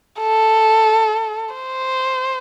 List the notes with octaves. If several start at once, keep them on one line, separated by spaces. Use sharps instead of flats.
A4
C5